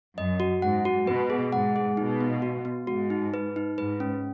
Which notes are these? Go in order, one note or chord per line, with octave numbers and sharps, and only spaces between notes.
F#2 D#5
F#4
G#2 F#5
F#4
B2 B4
G#4
G#2 F#5
G#4
B2 D#4
B3
F#4
B3
G#2 F#4
D#4
B4
D#4
G#2 B4
C#4